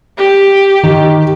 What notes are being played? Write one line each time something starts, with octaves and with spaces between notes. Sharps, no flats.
G4
D#3